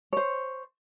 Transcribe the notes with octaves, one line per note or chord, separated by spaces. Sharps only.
C5 C#5